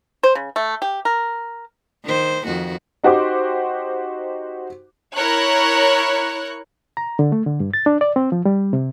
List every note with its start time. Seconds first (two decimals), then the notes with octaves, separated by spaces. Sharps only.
0.23 C5
0.35 C#3
0.56 A3
0.82 G4
1.05 A#4
2.04 D#3 C5
2.45 F2 D#3 F#4
3.04 D#4 F#4 G4 C5 D6
5.14 E4 A#4 C#5 C#6 F#6
6.97 A#5
7.19 D3
7.32 A3
7.46 D3
7.60 G2
7.74 A6
7.86 D4
8.01 D5
8.16 C4
8.32 F3
8.45 G3
8.73 C3